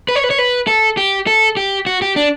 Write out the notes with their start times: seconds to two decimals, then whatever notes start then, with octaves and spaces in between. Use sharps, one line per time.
0.09 B4
0.15 C#5
0.24 B4
0.31 C#5
0.39 B4
0.67 A4
0.97 G4
1.27 A4
1.57 G4
1.86 F#4
2.02 G4
2.16 D4